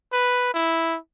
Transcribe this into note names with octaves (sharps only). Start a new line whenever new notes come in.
B4
E4